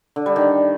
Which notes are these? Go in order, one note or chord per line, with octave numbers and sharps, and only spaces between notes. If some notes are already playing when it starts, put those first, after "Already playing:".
D3
G3
D#3